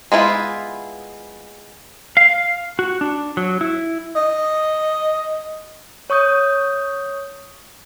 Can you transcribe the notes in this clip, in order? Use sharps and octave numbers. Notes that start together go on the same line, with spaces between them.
G#3 B3 E4 F4
F5
F#4
D4
F#3
E4
D#5
C#5 C#6 D#6 G6